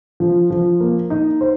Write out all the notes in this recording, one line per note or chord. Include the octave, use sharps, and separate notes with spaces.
F3
F3
A#3
D#4
C5